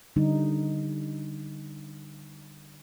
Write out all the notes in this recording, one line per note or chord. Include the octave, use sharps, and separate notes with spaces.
D3 G3 D#4